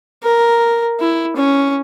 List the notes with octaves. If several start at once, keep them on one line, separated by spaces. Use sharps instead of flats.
A#4
E4
C#4